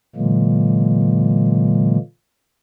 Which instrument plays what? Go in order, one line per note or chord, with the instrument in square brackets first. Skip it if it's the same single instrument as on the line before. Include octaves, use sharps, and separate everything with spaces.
[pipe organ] A#2 D3 E3 F#3 G#3 A#3